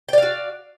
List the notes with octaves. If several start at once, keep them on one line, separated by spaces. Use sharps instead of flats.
F#4 D5 F5 G5